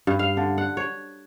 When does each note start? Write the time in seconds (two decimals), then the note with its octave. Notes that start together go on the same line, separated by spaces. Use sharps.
0.07 G2
0.19 F5
0.37 D3
0.58 F#5
0.77 C#5